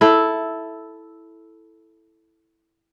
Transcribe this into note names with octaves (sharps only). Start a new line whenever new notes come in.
E4 A4